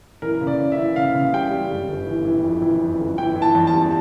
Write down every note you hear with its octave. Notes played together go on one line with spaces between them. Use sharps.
E3 A#4
C#3
D5
C#3
E5
E3
C#3 F5
C#3
G3 G5
G3
G1
G1
E3
E3
F2
E3
F2
G1
E3 G5
E3
A5
E2
A5
G3